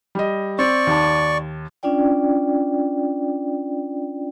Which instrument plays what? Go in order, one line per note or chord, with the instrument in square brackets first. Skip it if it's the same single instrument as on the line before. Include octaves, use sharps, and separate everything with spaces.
[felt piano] G3 D#5
[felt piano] C4 [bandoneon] D5 C#6
[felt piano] D#2 A5
[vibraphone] C#4 D4 F4 D5 G5